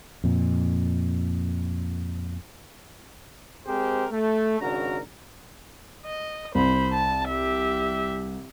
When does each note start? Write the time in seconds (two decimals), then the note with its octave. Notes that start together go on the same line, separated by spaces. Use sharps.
0.24 F2 A#2
3.67 G#3 C4 G4 G#4 A#4 C5
4.12 A3
4.61 G#1 C#3 D4 F#4 A#4 A#5
6.05 D#5
6.55 C2 C5 B5
6.92 A5
7.29 G4 E5